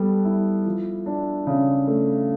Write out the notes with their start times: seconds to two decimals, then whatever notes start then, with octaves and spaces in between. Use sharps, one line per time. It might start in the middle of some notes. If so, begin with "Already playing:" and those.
Already playing: G3 B3 A4
0.24 E4
0.66 F3
1.06 D4
1.47 C#3
1.87 A3